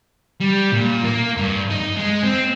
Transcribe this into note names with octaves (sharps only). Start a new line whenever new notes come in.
G3
A#2
A#3
G2
D#4
G#3
C4